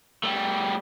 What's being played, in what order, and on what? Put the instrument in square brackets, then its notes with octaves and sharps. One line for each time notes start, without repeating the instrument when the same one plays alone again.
[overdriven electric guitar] G3 A3